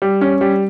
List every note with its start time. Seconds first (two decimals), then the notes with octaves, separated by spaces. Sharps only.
0.02 G3
0.21 C#4
0.41 G3